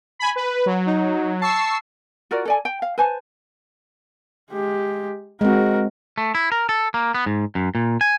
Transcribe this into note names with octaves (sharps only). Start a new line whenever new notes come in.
G#5 B5
B4
F#3
D#4
A5 C#6 E6 C7
F4 F#4 A#4 D5
A4 D5 G#5
G5
F5
B4 C5 G#5 A5
G#3 G4
G#3 C4 F#4 A#4
A3
E4
A#4
A4
A#3
B3
G#2
F#2
A#2
G#5